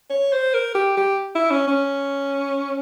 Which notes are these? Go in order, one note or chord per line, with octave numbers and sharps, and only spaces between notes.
C#5
C5
A#4
G4
G4
E4
C#4
C#4